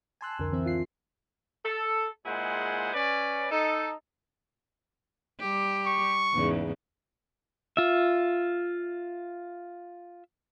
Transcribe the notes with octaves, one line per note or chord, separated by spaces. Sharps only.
G#5 A5 C6 E6 F#6
C2 F2 D3 A#4
E3 C4 E5
F4 C7
A4
A#2 G#3 E4 G#4 C5 F#5
C#4 B4 D5
D#4 A4
G3 G4
C#6
E2 G#2 C#3
F4 E5